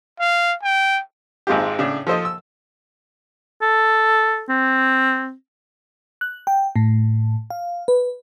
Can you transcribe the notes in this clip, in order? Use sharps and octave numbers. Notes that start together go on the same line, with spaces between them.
F5
G5
G#1 G#2 G#3 C4 F4 G4
A2 C#3 D4
F3 A4 C5 D#5
E6
A4
C4
F#6
G5
A2
F5
B4